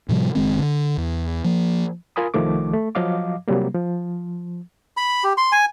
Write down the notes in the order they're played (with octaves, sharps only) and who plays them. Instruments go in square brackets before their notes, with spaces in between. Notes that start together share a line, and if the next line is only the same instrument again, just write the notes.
[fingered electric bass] A2 C3 F3 G3
F#1 D#3 G#3 C4
D3
E2
F3 A#3
[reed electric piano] F4 A#4 G#5 B5 D#6
C2 D#3 F3 A3 D6
A3
F3 F#3 D#5 F5 D6
C3 F#3 G3 A#3
F3
[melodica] B5
G4
C6
G#5